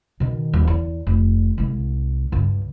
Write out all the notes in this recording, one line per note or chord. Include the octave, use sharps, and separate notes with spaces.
B2 D#3
D#1
E2
F1
C2 G#3
C#2 G2